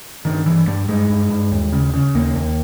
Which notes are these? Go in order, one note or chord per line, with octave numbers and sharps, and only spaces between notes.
G2 D#3
G2 E3
G2 G3
G2 G#3
G2
G2
D#2
C#3
C#3
D#2 A#3
D#2